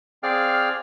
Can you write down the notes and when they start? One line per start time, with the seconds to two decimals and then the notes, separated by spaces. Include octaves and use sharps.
0.23 C4 G#4 D5 F5 G5 F6